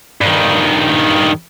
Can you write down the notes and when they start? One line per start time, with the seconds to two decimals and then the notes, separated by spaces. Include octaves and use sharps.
0.21 G2 D#3